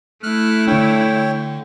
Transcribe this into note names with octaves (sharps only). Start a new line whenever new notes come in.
A3 E4 F6 F#6
D3 D4 C#5 G5